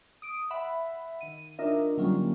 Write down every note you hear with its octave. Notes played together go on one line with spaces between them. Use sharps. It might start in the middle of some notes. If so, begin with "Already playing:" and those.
D#6 D7
E5 F#5 B5
D#3 D#7
D4 D#4 F4 A#4 D#5 E5
D3 F#3 G3 A#3 C#4 F4